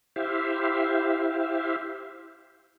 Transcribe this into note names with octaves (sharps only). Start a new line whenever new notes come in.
E4 G4 C5 E5 F5